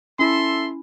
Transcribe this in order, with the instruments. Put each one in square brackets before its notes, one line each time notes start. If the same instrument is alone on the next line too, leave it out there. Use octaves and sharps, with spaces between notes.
[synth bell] C#4 E4 [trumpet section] A4 E5 C6